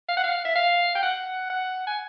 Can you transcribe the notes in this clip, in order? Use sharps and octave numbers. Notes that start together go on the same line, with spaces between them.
F5
F#5
F5
E5
F5
G5
F#5
F#5
G#5